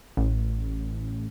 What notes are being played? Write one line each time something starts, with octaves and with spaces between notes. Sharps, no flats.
A1